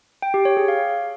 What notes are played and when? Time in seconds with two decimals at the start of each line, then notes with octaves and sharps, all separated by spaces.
0.22 G5
0.34 G4
0.45 C#5
0.57 G#4
0.68 F5